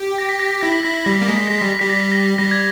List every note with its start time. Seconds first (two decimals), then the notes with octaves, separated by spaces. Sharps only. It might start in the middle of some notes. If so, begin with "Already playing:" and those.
Already playing: G4
0.18 A#6
0.29 B6
0.39 A#6
0.51 B6
0.61 E4 A#6
0.72 B6
0.83 E4 A#6
0.94 B6
1.05 G3 A#6
1.15 B6
1.22 A#3
1.26 G#3 A#6
1.37 B6
1.47 G#3 A#6
1.58 G3 B6
1.69 A#6
1.79 G3 B6
1.89 A#6
2.00 B6
2.12 A#6
2.38 G3 A#6
2.51 G#6